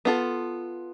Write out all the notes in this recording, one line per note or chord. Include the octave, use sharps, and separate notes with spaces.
B3 F4 A4